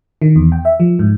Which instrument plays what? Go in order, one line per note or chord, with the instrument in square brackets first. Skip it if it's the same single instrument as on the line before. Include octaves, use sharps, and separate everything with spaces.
[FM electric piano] D#3
E2
G5
E5
F3
G#2